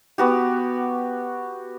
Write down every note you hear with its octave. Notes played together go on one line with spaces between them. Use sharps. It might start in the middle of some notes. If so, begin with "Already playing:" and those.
B3 F#4 G4